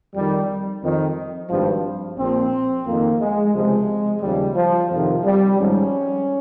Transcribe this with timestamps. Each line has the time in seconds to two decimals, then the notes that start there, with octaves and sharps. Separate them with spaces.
0.15 F2 D#3 G3
0.83 F2 D#3
1.50 G#1 G2 F3
2.18 A#1 A#2 F3 C4
2.86 F2 D#3 A#3
3.20 G#3
3.54 C#2 C3 F3 G#3
4.22 D#2 C#3 F3 G3
4.55 F3
4.90 F2 C3 D#3 F3
5.24 G3
5.57 G#1 G#2 F3 C#4